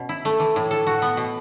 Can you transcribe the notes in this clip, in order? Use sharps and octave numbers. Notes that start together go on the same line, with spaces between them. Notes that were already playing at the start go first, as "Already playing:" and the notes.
Already playing: B2 C#4
E4
A3
E3
A2
A4
F#4
B3
B2